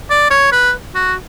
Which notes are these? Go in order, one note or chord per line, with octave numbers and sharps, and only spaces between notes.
D5
C#5
B4
F#4